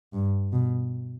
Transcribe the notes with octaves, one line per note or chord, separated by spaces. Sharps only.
G2
B2